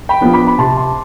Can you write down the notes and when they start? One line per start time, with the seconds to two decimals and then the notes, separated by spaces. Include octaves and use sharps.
0.09 G5 B5
0.21 F3 B3 D4
0.33 B5 D6
0.47 B5
0.58 C3 A5 C6
0.77 A5 C6